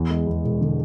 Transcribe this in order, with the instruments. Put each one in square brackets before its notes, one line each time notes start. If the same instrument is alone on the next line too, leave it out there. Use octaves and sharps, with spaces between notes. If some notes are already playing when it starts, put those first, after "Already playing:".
Already playing: [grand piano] E2
G#3
E2
E1
D3